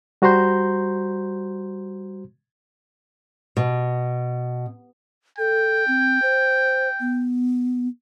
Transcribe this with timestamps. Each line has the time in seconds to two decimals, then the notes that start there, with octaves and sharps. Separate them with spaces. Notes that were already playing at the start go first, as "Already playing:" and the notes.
0.22 G3 F#4 C5 A#5 C6 G6
3.57 B2
5.39 A4 G5
5.88 C4
6.22 C5
7.00 B3